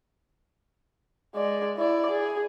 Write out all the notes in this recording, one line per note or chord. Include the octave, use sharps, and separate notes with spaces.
G#3 D5
E4 D5
G#4